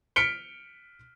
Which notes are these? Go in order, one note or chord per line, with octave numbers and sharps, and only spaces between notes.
F6 B6 C#7 D7 G7